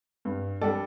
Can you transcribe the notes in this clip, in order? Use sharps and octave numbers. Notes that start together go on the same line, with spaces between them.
G2
G3 D4 A4 D5